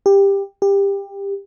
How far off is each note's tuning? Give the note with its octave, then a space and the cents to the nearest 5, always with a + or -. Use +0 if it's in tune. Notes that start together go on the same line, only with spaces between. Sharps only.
G4 +15
G4 +20